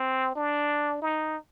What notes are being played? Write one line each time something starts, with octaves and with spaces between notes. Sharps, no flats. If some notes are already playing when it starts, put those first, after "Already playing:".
Already playing: C4
D4
D#4